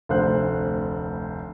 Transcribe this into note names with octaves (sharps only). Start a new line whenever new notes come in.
F1 D2 C5 F#6